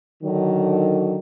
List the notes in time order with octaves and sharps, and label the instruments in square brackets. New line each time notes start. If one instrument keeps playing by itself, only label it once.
[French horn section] D3 D#3 F#3